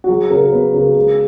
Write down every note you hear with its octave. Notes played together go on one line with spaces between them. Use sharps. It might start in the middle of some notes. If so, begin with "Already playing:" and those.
F#4
F#3 G#4
C#3 A#4
B3 B4
C#3 A#4
G#3 G#4